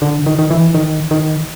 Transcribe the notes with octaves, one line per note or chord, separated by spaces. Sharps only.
D3
D#3
D#3
E3
D#3
D#3